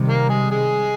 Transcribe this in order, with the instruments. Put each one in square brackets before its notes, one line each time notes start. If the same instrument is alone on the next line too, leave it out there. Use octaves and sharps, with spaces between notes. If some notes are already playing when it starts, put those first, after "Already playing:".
Already playing: [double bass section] C3 D#3 G3
[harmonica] A#3 A#4
G#3 G#4
G#3 G#4